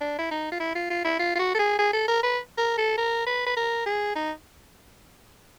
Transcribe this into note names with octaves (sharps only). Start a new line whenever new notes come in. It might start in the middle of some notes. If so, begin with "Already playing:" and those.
D4
E4
D#4
F4
E4
F4
F4
E4
F4
F4
F#4
A4
G#4
G#4
A4
A#4
B4
A#4
A4
A#4
B4
B4
A#4
G#4
D#4